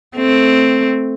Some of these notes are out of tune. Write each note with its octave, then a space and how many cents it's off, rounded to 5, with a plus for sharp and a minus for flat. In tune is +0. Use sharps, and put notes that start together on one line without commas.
A3 +0 C4 +0